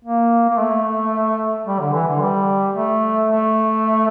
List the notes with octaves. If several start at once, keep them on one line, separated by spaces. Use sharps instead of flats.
A#3
A#3
A3
G3
D3
E3
D3
G3
A3
A3